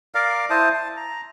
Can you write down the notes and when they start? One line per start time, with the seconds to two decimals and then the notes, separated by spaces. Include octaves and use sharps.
0.15 A#4 D5 F5
0.50 E4 C5 A5 D#6
0.74 A5
0.97 A#5